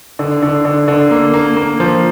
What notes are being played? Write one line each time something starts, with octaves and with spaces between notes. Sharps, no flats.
D3
D3
D3
D3
A#3
A#3
A#3
F3